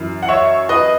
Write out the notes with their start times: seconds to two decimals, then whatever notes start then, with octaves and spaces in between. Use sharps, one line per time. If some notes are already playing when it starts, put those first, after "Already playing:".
Already playing: F#2 E3
0.23 F#5
0.29 C#5 E5
0.69 B4 D#5